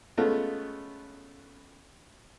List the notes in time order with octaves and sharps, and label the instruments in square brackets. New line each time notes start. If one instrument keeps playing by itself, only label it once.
[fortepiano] G#3 A3 B3 C#4 F4